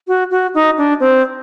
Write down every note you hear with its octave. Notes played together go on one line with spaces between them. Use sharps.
F#4
F#4
D#4
D4
C4